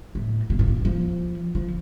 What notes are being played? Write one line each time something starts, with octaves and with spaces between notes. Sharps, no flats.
A2
A#2
A2
A#2
F3
F3